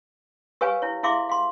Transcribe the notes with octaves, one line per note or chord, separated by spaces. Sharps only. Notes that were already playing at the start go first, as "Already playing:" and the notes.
G4 A#4 B4 C#5 F5 G#5
E4 C#5
E4 G#4 E5 F5 C6 D6
F5 C6